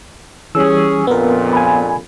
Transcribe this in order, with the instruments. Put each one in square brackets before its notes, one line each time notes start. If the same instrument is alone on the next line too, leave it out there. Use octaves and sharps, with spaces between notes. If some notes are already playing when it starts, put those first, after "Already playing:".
[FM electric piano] E3 G3 [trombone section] C#4 G#4 [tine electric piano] E6
[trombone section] A#1 F2 A#2 [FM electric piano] B3 A#4
[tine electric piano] G#5 B5